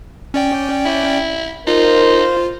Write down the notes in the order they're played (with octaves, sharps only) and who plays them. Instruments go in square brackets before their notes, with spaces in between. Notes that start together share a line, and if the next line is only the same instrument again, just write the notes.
[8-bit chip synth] C#4 D5 G5
[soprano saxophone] E4
[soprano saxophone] D#4 [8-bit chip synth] F4 [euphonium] A#4 [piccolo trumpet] C5